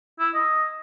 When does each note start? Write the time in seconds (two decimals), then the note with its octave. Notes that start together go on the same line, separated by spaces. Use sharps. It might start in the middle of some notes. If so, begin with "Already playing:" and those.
0.19 E4
0.35 D#5